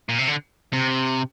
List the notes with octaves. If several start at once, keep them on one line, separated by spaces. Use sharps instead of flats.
A#2
C3
D3
C3